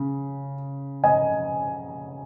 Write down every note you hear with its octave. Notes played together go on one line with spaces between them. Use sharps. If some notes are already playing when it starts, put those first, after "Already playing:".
Already playing: C#3
D#5 G#5